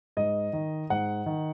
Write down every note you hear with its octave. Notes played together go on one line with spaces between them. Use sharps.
G#2 D#5
D#3
G#2 F#5
D#3